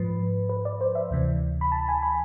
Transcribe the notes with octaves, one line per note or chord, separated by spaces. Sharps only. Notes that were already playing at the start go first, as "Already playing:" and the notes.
Already playing: G#2 F3 B4
B4
D5
C5
E5
D2 C3 E3
B5
A5
G#5
B5